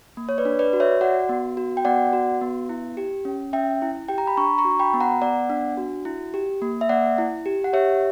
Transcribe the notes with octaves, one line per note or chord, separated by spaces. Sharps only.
A#3
C#5
B4 D5
D4
B4 D5
F#4
C#5 E5
F#4 D5 F#5
B3
F#4
G5
B3 D5 F#5
F#4
B3
E4
G4
C#4
C#4 E5 G5
E4
G4 G5
A#5
B5
D4 A#5 C#6
A#5 C#6
F#4
G5 B5
B3
F#5 A#5
B3 D5 F#5
D4
F#4
E4
G4
A#3
E5
A#3 D5 F#5
E4
G4
F#5
G4 C#5 E5